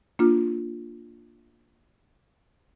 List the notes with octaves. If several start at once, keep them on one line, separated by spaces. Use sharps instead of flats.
A#3 D4 F4